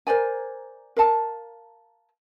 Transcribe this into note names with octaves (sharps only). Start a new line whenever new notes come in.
A#4 C5 D5 G#5
A#4 F5 A5